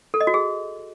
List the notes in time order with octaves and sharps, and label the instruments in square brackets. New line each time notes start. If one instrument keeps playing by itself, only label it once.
[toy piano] A4
D#5
F#4
G#4